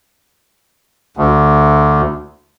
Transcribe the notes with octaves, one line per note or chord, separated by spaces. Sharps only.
D2